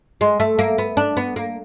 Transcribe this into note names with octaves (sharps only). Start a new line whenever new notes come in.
G#3
A3
A#3
B3
D4
B3
A#3